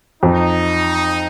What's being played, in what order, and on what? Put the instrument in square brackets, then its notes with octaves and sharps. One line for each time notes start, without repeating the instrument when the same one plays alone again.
[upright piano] F2 [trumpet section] D#4